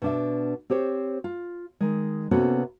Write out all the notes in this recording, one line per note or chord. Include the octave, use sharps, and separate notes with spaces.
B2 D4 E5
C4 G4 C5 C#5
F4
D#3 G#3
C3 A#3 B3 C#4 F#4 A4